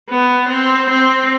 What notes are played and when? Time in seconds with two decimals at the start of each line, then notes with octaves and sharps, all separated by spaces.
0.09 B3
0.49 C4
0.90 C4